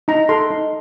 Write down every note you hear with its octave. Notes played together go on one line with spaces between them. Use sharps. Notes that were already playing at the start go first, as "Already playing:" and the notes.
D#4 A#5
A4 C6
D#4